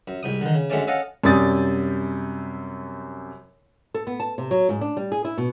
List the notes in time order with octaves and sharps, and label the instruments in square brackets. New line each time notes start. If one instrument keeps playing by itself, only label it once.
[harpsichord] F#2
C2 G#2 D#6
D3 D#3
C#3
F#2 D3 G#3 A3 C#4 D5
C#4 A4 D#5 F5 F#5
[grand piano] F#2 C3 G3 D#6 A6
[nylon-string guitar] A4
B3
A5
C3
F#3
G#2
D4
G3
G#4
E4
B2